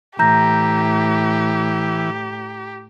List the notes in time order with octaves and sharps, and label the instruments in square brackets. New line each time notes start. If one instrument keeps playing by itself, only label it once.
[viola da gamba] A2 [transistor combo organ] E3 [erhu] G4 [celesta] A#5 G6 A#6